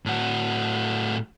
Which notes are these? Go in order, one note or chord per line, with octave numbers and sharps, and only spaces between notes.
A2 F#4